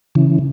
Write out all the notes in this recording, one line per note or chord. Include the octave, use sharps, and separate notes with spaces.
C#3 E3